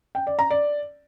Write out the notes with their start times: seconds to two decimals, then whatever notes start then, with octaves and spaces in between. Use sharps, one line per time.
0.15 G5
0.27 D5
0.39 A#5
0.50 D5